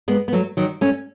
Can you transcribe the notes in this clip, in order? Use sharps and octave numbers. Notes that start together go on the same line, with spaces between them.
G#3 B3
B3
F#3 A3
D#3 F#3
A3 C#4